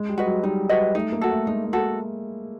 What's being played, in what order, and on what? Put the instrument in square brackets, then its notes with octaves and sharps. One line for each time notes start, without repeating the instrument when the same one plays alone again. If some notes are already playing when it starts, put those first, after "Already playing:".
Already playing: [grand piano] G#3
G3
[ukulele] F#4 B4 D#5
[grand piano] F#3
[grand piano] G3 [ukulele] D#4
[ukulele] F#4 B4 D#5
[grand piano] A3 [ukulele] D#4
[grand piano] A#3
[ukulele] F#4 A4
[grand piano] A3
[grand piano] G#3 [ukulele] D#4
[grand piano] A3
[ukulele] F#4 A4